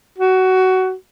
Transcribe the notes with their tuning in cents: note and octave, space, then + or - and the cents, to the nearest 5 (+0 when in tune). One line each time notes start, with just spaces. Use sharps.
F#4 +20